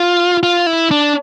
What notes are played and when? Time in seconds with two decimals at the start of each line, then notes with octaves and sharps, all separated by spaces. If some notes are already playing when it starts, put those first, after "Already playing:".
Already playing: F4
0.43 F4
0.67 E4
0.91 D4